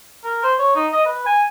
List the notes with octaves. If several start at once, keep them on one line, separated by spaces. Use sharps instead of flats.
A#4
C5
C#5
D#4
D#5
B4
G#5